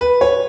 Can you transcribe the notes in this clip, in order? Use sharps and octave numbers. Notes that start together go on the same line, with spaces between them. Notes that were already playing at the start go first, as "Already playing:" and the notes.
B4
C#5